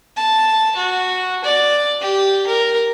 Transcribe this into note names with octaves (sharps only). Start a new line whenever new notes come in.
A5
F#4
D5
G4
A#4